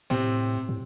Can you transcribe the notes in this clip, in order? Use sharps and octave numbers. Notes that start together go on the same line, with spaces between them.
A2 C3 C4
A2